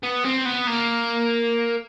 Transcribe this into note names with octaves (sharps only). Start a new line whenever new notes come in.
B3
C4
B3
A#3